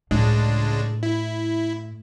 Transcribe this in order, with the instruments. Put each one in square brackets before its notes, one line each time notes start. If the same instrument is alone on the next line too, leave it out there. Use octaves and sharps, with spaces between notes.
[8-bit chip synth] C#2 G#3 D4 [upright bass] A2
[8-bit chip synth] E4